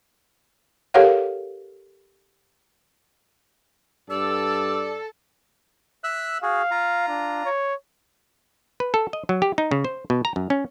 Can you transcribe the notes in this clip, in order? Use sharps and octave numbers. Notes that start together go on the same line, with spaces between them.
G4 A4 A#4 C#5 F5 F#5
G2 A4 D5 E6
E5 E6 F#6
F#4 G#4 F5
F4 A#5
D4
C#5
B4
A4
D#5
F#3
G4
D#4
C#3
C5
B2
A#5
F#2
C#4